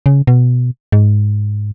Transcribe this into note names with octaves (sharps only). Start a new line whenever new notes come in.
C#3
B2
G#2